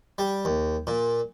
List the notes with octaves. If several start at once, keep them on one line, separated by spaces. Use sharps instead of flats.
G3
D#2
A#2